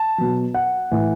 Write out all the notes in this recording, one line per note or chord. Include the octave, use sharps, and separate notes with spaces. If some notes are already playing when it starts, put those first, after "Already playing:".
Already playing: A5
B2 F#3
F#5
A2 E3